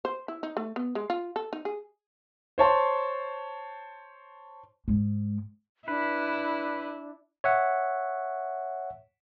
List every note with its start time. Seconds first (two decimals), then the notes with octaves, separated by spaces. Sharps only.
0.05 C5
0.28 E4
0.43 D#4
0.57 A3
0.76 B3
0.95 G#3
1.10 F4
1.36 A4
1.53 D#4
1.65 G#4
2.58 C5 C#5 A5 C6
4.88 G#2 G#3
5.88 D4 E4 B4
7.44 C#5 E5 F#5